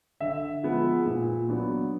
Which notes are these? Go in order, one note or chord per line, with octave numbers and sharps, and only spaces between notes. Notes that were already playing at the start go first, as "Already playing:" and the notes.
D3 E5
F3 G#3 B3
A#2
F#3 B3 D4